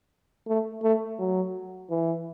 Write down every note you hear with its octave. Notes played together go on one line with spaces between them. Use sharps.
A3
A3
F#3
E3